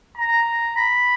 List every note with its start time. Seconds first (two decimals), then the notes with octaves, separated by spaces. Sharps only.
0.17 A#5
0.76 B5